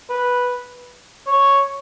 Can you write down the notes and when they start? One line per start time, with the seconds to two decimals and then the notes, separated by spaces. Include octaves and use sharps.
0.10 B4
1.27 C#5